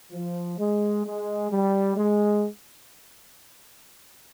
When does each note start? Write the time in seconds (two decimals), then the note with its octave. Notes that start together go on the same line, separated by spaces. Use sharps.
0.12 F3
0.58 G#3
1.05 G#3
1.51 G3
1.96 G#3